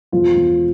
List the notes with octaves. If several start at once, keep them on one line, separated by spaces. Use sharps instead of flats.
E1 F3 F4
E1